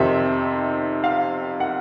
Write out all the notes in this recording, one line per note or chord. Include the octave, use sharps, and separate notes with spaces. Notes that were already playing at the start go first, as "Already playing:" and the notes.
Already playing: F2 C3 D#3 E5
F5
F#5